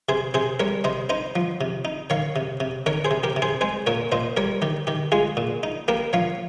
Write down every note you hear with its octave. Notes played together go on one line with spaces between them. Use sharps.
C3 G#4 C5
C3 G#4 C5
G3 A#4 C#5
C3 C5 D#5
D#4 C5 D#5
F3
C3
D#4
D#3 C#5 F5
C3
C3
D#3 A#4 C#5
G#4 C5
C3
G4 A#4
C3
G#4 C5
G#3 G#4 C5
A#2 A#4 C#5
A#2 C5 D#5
G3 A#4 C#5
D#3 G4
D#3 G4
G#3 F4 G#4
A#2
D#4
A#3 G4 A#4
F3 C#5 F5